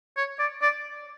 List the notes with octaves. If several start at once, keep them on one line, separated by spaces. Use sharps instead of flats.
C#5
D5
D5